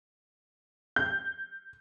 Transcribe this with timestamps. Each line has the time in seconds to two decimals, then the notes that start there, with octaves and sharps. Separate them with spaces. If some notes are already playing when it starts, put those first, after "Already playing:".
0.96 G6